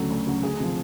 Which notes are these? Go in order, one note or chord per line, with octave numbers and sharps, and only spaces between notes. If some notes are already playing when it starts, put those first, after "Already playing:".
Already playing: D2 C#3 F#3 A4
D2
C#3 F#3
D2 G#4
C3 F3